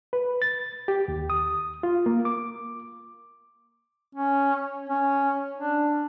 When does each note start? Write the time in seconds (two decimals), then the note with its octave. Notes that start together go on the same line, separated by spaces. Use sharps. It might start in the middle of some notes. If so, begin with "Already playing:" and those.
0.13 B4
0.42 A6
0.88 G4
1.08 D#2
1.30 D#6
1.83 F4
2.06 A#3
2.25 D6
4.15 C#4
4.90 C#4
5.58 D4